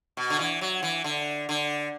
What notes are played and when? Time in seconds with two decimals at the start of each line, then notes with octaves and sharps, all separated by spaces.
0.17 B2
0.30 D3
0.39 E3
0.61 F#3
0.83 E3
1.04 D3
1.49 D3